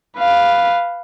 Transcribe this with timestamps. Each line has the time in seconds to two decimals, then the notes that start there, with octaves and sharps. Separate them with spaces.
0.18 B4 F5